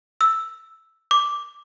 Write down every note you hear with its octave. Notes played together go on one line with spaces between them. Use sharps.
E6
D6